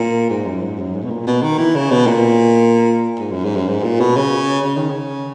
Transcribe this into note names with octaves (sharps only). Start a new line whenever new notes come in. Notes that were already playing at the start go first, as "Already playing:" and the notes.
Already playing: A#2
G#2
F#2
G#2
F#2
G#2
B2
A#2
B2
D#3
E3
C#3
B2
A#2
G#2
F#2
G#2
F#2
G#2
A#2
B2
C#3
C#3
D#3
C#3